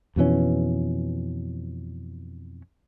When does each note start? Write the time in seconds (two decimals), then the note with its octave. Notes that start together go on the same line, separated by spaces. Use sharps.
0.16 F2 B2 E3 C#4